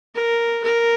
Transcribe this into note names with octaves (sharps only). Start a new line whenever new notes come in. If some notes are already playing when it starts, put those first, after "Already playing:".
A#4
A#4